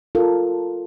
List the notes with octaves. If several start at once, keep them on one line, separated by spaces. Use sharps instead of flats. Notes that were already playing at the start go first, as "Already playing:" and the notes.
F4 A4 A#4